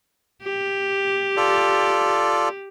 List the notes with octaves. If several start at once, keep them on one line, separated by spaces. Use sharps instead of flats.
G4
F4 A4 D5